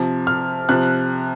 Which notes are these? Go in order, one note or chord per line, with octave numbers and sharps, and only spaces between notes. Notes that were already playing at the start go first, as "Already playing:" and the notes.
Already playing: C3 F3
F6
C3 F3 F#6